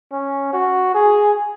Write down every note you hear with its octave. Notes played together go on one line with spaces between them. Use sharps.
C#4
F#4
G#4